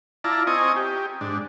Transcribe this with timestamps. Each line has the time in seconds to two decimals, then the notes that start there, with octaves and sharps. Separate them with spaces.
0.24 E4 F4 D5 A5 A#5
0.47 C4 D#5 G#5 A#5 C#6 D#6
0.76 G4
1.21 G#2 D4